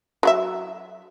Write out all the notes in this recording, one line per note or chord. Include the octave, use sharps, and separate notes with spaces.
F#3 F#4 E5